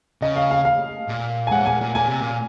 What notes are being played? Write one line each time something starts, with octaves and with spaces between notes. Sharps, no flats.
C#3 D#5
F5
F5
F5
A#2
G#5
G#2 F#5
A#2 G#5
A#2
A#2 G#5
C3
A#2